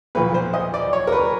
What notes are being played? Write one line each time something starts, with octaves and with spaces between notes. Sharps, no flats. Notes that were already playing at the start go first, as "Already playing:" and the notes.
B1 A#2 F3 B4
C5
D#5
D5
C#5
A#4
B4